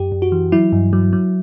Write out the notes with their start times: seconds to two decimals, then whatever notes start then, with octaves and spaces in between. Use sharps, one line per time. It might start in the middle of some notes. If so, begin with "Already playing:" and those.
Already playing: F#2 G4
0.12 F#2
0.22 F#4
0.32 E3
0.52 F#3 E4
0.72 G2
0.93 F#3
1.13 F#3